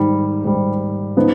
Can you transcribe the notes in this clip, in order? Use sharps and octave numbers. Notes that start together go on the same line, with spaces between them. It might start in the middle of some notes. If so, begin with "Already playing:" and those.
Already playing: G#2 D#3 G3
G#2 D#3 G3
F3 B3 D#4